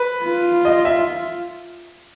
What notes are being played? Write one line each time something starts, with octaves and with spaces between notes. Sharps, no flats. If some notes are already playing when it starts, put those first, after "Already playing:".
Already playing: B4
F4
D#5
E5